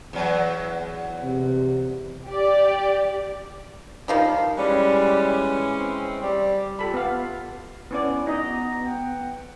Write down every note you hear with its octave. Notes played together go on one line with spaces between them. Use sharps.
E2 F#3
C3
G4 D5
D#3 F3 G3 F5
E3 G3 G#3 C#4
C4
G3
F4 G4 A4 B5
B3 F5
B3 C#4 E4 D5
B3 D#4 F#4 D#5 A#5
B4 F#5 G5